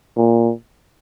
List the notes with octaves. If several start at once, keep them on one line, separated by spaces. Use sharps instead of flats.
A#2